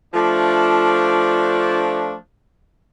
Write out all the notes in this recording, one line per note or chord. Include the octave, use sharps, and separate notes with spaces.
F3 A3 D4